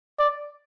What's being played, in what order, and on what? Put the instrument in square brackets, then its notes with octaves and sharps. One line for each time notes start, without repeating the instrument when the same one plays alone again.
[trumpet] D5